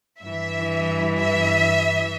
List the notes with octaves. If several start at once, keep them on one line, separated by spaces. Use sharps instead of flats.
G2 E3 E5
E5